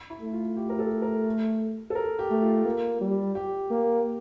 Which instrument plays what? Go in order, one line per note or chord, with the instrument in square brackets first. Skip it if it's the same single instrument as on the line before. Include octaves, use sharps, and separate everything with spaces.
[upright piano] E4
[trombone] A3
[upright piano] F4
G4
A#4
A4
A#4
A4
A#4
G4
[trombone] A3
[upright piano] F4
[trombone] A#3
G3
[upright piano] G4
[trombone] A#3